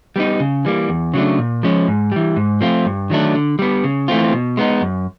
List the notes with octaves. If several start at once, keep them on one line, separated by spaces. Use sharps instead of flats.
G3 B3 D#4
C#3
E3 G3 A#3
E2
C#3 F#3 A3 D4
A#2
F3 G#3 C#4
G#2
E3 G3
G#2
F3 A3 C4 F4
G2
D#3 F#3 A3 D4
D3
G3 B3
C#3
E3 A3 C4 F4
B2
G#3 B3 D#4
F#2